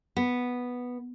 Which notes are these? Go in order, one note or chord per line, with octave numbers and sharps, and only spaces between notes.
B3